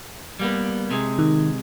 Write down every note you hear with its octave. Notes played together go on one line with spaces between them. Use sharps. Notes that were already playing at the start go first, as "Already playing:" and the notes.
G3 A#3 B3
C3 G#3
D#3